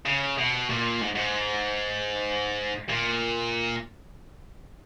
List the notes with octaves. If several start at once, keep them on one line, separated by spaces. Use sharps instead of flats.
C#3
B2
A#2
G#2
G#2
A#2